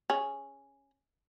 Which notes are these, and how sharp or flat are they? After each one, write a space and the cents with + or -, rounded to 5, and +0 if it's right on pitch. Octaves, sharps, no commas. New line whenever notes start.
C#4 +0 G#4 +0